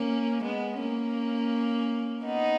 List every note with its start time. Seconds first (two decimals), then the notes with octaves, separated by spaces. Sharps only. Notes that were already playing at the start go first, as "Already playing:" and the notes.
Already playing: A#3 C#4
0.43 G#3 B3
0.80 A#3 C#4
2.24 B3 D#4